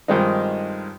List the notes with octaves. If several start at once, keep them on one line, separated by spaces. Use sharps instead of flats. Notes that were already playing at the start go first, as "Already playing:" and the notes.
G2 D#3 F3 G#3 C4 D#4